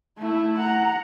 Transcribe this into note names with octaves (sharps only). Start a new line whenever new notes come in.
A3 E4
F#5 A#5